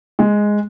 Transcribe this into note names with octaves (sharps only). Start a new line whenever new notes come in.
G#3